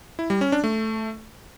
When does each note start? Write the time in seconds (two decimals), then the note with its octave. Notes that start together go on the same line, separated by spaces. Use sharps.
0.19 E4
0.30 G3
0.41 C#4
0.52 D4
0.64 A3